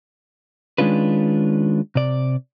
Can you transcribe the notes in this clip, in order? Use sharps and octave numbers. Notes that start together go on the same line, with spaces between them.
D#3 G#3 C#4 D4 F4 B4
C3 D5